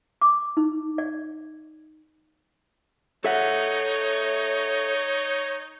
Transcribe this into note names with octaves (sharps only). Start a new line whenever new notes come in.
D6
D#4
D5
D#4 A4 C#5 E5 F#5